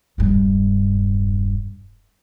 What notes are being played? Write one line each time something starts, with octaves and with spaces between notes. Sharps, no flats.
E1 G2